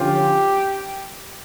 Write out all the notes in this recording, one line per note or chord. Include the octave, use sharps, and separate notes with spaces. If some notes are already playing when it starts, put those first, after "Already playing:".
Already playing: D3 F3 C#4 F4 G4